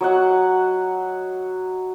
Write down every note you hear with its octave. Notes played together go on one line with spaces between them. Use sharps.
F#3 D#5 F#5